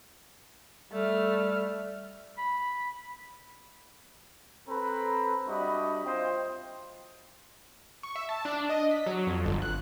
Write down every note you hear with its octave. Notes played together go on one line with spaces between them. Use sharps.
G3 A3 F6
B5
C4 A4 B4 A#5 B5
G3 D4 F#4 D#5 E5 B5
C4 F4 C5 D#5 G5
C#6
E5
A5
D4
D#5
B6
F#3
F2
G1
F#6